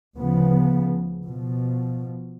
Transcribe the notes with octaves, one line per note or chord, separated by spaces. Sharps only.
D2 C#3 F3 B3
B2 F3